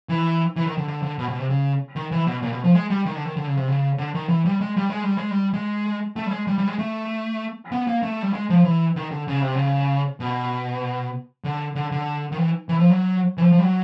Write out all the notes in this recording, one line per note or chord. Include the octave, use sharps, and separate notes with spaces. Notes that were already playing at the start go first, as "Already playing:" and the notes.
E3
E3
D#3
D3
D3
D3
B2
B2
C3
C#3
D#3
E3
B2
A#2
B2
F3
G#3
G3
D#3
D3
D#3
D3
C#3
C3
C#3
D3
D#3
E3
G3
G#3
G3
G#3
G3
G#3
G3
G#3
A3
G3
G#3
G3
G3
G#3
A3
B3
A#3
A3
G3
G#3
F3
E3
D#3
D3
C#3
C3
C#3
B2
D3
D3
D3
D#3
E3
E3
F3
F#3
E3
F3
F3
G3
F#3